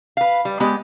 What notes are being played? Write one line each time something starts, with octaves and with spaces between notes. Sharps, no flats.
B4 F5
G3
G#3 B3 G4